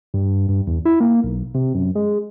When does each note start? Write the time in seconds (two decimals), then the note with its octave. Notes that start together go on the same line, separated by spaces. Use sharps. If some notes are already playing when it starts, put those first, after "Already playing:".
0.14 G2
0.49 G2
0.67 E2
0.85 E4
1.00 A#3
1.24 B1
1.55 C3
1.75 F#2
1.95 G#3